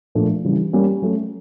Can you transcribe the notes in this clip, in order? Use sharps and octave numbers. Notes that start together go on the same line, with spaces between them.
A#2 F3 A3 D4
C#3 E3 G3
G3 A#3 C#4
F#3 A3 C#4